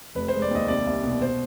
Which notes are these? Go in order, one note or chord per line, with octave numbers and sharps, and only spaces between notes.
F1 B4
C5
G#3
D5
D#2 D#5
C2 D5
C2
B2
C5